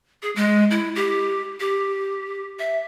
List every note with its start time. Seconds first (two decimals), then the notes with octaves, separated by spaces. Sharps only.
0.23 G#4
0.36 G#3
0.71 E4
0.96 G4
1.60 G4
2.59 E5